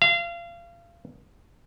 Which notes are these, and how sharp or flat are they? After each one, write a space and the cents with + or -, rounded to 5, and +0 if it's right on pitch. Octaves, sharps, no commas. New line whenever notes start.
F5 -30